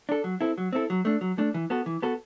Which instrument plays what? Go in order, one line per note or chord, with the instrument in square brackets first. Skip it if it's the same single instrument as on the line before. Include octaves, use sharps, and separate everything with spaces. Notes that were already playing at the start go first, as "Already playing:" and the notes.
[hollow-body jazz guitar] D4 A4
F#3
C4 E4 A4
F#3
C4 E4 A4
F#3
A3 D4
F#3
A3 D4
E3
B3 F#4 A4
E3
B3 F#4 A4